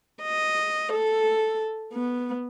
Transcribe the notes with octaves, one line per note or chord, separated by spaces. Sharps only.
D#5
A4
B3